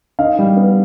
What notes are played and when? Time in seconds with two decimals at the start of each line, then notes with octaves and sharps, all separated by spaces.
0.19 D#3 D#5 F5
0.39 G3
0.57 B3